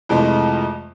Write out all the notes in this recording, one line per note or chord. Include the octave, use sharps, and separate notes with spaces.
F2 C3 E3 G#3 A3